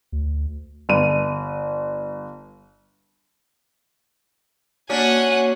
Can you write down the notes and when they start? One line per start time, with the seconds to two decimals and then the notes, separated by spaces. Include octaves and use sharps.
0.12 D2
0.89 G1 D#7
4.90 A#3 C#4 D4 F#4 F#5 G#5